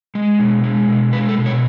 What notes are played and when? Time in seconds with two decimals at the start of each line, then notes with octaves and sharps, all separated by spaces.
0.15 G#3
0.39 B2
0.63 G#3
0.88 B2
1.13 G#3 B4
1.29 A4
1.38 B2
1.46 C#5